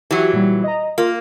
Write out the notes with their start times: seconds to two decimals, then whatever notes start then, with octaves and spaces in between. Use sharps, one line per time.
0.11 E3 F#3 F#4 G4
0.33 A#2 G3
0.64 D#5 A#5
0.98 A#3 F4